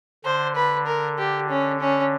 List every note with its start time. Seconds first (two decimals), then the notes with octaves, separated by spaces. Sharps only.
0.24 D3 C5
0.56 B4
0.87 A#4
1.18 G4
1.50 C#4
1.80 C#4